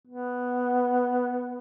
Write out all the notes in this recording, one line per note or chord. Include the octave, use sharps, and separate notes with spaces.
B3